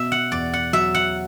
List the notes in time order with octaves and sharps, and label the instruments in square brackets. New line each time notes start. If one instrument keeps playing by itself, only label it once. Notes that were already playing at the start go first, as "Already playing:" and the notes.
Already playing: [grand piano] B2 [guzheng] E5
[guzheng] F#5
[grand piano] E2 [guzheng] D5
[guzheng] F#5
[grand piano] F#3 [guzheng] E5
[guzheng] F#5